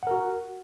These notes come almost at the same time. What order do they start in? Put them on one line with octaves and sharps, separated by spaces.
F#5 A#4 F#4